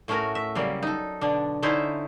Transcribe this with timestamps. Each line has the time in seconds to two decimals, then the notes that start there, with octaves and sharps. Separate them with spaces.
0.08 A2 A3 C#4 F#4 A#4
0.35 E5
0.55 C#3 F#3 G3 A#3
0.83 D#4 A4
1.21 B2 D3 D4
1.63 D3 C#4 D#4 E4 C5